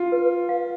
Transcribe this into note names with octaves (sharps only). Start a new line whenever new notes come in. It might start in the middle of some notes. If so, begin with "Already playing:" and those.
Already playing: F4
B4
F5